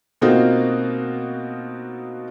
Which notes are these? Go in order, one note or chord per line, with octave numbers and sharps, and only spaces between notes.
B2 A#3 C4 D#4 F4 F#4